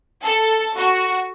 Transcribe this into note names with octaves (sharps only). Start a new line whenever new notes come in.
A4
F#4